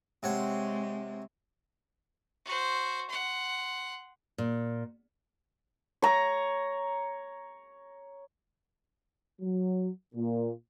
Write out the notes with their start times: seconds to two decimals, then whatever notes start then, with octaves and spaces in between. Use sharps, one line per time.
0.23 C3 G#3 C4 C#5 F#5
2.45 F#4 C5
3.10 F#5 C6
4.38 A#2
6.02 C#5 A#5
9.40 F#3
10.15 A#2